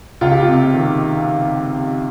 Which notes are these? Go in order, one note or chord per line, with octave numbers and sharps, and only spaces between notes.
C#2 F4
G4
F4
C3
D#3